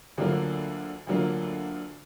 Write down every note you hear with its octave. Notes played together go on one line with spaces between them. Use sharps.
D2 D3 F#3 A#3 F4
D2 D3 F#3 A#3 F4